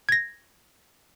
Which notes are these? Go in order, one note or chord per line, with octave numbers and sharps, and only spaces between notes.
G#6 A#6